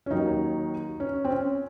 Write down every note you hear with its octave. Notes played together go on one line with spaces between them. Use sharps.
C#4
D#2 D#3 F#3 D#4
C#4
C4
C#4